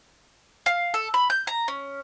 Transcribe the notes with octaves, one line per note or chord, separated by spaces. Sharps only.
F5
A4
B5
G6
A#5
C#4